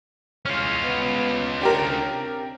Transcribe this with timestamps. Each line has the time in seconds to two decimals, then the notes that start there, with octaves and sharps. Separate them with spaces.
0.46 E2 C#4 F4 F6
0.83 B3
1.61 D2 D4 G4 A#4
2.12 C3